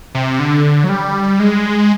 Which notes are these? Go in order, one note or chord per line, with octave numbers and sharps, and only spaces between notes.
C3
D3
F#3
G3
G#3